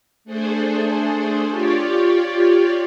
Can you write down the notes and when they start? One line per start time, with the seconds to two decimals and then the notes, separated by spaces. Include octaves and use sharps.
0.24 A3 D4 G#4 A4 C5
1.48 F4 G4 C#5 D5